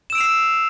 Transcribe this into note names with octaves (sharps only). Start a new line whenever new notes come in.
E6 C7 D7 E7 F7